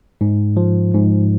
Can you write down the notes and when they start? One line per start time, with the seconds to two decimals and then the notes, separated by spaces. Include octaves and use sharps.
0.21 G#2
0.57 F3
0.94 G#2